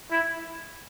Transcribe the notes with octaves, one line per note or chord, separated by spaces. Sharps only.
E4